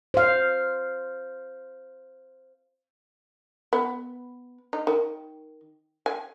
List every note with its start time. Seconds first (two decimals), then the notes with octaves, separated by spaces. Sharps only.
0.14 C5 F5
3.73 B3
4.73 D#4
4.87 D#3
6.06 G#5